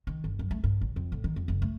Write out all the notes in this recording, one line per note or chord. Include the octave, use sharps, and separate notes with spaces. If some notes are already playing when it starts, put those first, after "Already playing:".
D#3
G1
F#2
A3
G2
A1
F2
A2
D#3
F2
F#1
A3